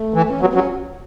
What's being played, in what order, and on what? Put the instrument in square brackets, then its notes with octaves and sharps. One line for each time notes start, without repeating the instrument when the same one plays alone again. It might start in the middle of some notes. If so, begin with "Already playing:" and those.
Already playing: [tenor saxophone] A3
[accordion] E3
[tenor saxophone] C#4
[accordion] F#3 [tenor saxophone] B3
[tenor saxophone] B3
[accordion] F#3 [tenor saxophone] C#4